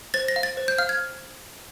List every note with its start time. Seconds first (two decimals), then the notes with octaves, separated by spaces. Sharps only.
0.14 C5 A6
0.28 A#6
0.36 F5
0.43 A6
0.57 C5
0.68 G6
0.78 F5 F6
0.89 G#6